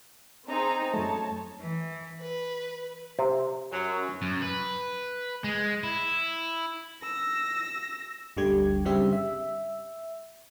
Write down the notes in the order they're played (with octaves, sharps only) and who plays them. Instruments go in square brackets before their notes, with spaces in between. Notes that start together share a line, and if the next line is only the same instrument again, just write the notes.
[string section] C4 D#4 G#4 [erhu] A#5
[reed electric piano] F#2 F#3 A3 [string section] C#5 [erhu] A5
[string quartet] E3
B4
[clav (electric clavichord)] C3 C4
[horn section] F#2 F#3
[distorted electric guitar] F#2
B4
G#3
E4
[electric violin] E6 A#6
[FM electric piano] G1 D2 D3 G3 G4 G#6
G2 C#3 G3 C4 G4 E5
E5